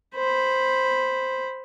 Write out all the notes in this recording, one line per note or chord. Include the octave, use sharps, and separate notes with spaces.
C5 B5